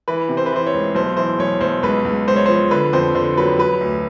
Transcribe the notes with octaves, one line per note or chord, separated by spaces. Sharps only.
E3 B4
C3
C5
B4
E3 C5
C#5
C#2
B1 C5
E3 C5
B1 C#5
B1 C5
C#2 B4
C#2
C#2 C5
C#5
F3 C5
D3 B4
F2 C5
D3 C5
F#3 B4
F#3 B4
D2